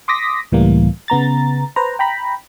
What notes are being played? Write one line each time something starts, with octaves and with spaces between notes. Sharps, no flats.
C6 D6 D#6 A#6 B6
C#2 A2 E3 G3 A#3
C#3 B3 A#5 A6
B4 C5 A#5
G5 A#5 B5